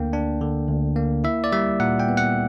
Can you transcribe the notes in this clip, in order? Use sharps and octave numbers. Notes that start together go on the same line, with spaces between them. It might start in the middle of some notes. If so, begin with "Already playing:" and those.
Already playing: D2 D3 A#3 D4 G5
D4
D3
D2
A#3
E4 E5
D5
G3 E5
A#2 F#5
G5
B3
F#5